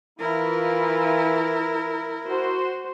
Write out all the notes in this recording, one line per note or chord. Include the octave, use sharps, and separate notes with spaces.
E3 E4 F4 A#4
F#4 C5